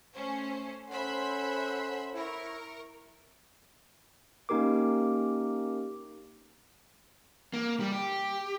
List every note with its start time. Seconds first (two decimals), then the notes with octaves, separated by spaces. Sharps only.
0.14 A3 C#4 C5
0.90 C#4 A4 C5 E5 F#5 B5 C6
2.14 E4 A#4 C#6
4.49 A#3 C#4 D#4 G4 A#4 D6
7.54 A#3
7.80 G3
7.92 G4